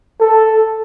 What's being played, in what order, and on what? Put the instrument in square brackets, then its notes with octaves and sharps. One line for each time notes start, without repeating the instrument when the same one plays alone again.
[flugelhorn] A4